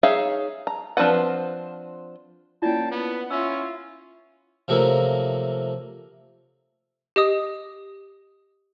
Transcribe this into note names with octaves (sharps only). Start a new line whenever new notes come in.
D#4 G#4 C#5 E5 F5
A#5
F3 C4 D4 B4 F#5
A#3 C#4 E4 F4 D5 G5 A5
B3 F#5
C#4 E4 F4 E6
C3 F3 F#3 A3 A#3
G4 D#5 D#6